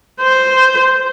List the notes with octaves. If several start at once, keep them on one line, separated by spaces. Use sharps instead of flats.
C5